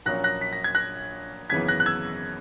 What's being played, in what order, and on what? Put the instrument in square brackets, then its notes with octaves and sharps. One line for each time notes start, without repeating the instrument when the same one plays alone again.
[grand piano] A#1 A#2 F#3 A#3 C#4 F#6 A#6
F#6 A#6
B6
A#6
G#6
F#6 A#6
G#1 F#2 C#3 E3 B3 G#6 B6
F#6 A#6
F#6
E6 G#6